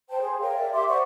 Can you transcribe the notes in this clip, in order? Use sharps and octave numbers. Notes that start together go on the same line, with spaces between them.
C5 G5 A5
G#4 C6
A#4 C#5 F5 G5
D5 E5
G4 E5 C6 D6
C5 D5 F#5 C#6